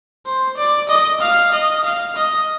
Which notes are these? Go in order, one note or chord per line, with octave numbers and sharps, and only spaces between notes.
C5
D5
D#5
F5
D#5
F5
D#5